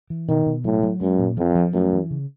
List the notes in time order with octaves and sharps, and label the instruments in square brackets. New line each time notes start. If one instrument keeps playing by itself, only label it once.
[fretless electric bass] E3
[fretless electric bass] B2 [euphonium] D#3
[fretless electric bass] B2
[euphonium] A2 [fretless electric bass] F#3
[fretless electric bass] F#3
[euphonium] F#2 [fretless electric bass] G#3
[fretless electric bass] A#2
[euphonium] F2 [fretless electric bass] F3
[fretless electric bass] F3
[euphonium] F#2 [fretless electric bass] A3
[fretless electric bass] E3
C#3